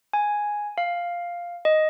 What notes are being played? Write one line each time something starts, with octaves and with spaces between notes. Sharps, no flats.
G#5
F5
D#5